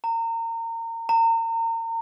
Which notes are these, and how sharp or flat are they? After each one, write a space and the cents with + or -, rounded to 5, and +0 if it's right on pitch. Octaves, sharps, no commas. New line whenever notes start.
A#5 -30
A#5 -35